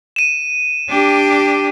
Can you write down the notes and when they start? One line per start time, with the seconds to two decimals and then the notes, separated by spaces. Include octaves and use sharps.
0.16 D#7 E7
0.89 D4 G4